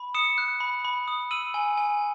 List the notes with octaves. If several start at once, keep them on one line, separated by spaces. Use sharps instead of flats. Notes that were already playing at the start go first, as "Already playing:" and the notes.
Already playing: B5
D#6 C#7 E7
F#6
B5
B5
D#6
E6 D#7 F#7
G#5
G#5